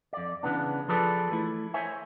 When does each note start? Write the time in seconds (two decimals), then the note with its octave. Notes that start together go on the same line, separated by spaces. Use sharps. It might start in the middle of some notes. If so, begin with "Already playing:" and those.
0.13 F2 D5
0.43 C#3 E3 B3 D4
0.88 F3 F4 G#4 A4 B4 D5
1.31 E3 A3 E4
1.74 A#4 C5 C#5 E5 G#5